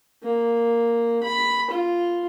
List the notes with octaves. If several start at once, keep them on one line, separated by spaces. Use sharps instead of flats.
A#3
B5
F4